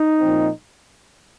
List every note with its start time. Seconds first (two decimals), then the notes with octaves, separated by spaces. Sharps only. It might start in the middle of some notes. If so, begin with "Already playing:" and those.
Already playing: D#4
0.19 A#2 F3 C4